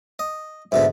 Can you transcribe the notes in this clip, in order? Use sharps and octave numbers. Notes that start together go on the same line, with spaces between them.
D#5
G#2 B2 D3 E5